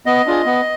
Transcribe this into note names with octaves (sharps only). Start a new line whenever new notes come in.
B3 D#5
D4 F4 G#4
B3